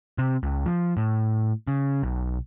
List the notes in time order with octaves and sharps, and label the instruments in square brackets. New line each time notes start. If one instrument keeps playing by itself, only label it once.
[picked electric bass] C3
C#2
F3
A2
C#3
B1